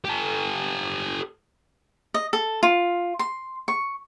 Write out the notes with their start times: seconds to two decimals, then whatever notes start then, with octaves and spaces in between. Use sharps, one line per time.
0.05 G4 A4
2.14 D#5
2.33 A4
2.63 F4
3.19 C6
3.68 C#6